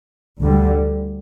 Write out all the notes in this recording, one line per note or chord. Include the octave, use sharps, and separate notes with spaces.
D2 D3 G3